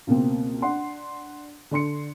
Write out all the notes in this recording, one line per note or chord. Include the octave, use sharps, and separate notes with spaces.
C#2 B2 A#3 C4
D4 F#5 C6
D3 D4 C6 C#7